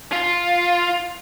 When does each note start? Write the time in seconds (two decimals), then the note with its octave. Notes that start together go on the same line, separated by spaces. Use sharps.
0.12 F4